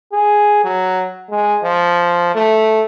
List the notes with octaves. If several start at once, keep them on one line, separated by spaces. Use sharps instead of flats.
G#4
F#3
G#3
F3
A3